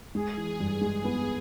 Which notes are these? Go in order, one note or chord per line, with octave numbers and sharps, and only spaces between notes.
G#3 G#4
E3
G2 G#4
G#3
B3 G#4